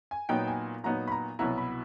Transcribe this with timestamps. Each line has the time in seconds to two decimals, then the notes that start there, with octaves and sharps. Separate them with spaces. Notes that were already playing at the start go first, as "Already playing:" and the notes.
0.11 G#5
0.29 A#2 F#3 B3 D#4 G5
0.47 G#5
0.84 A#2 F#3 B3 D#4 A#5
1.08 B5
1.12 A#5
1.39 C2 B2 F#3 B3 E4 A#5
1.58 B5